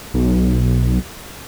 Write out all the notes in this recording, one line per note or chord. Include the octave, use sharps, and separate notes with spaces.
B1